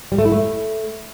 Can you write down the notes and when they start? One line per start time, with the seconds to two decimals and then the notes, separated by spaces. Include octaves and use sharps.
0.12 G3
0.18 A3
0.25 E4
0.32 A3